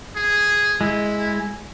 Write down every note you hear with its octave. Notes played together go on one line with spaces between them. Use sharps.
G#4
G#3 E4